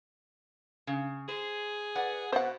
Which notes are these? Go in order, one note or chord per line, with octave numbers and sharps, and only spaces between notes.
C#3
G#4 C5
B4 D5 F#5
B2 B3 C5 F#5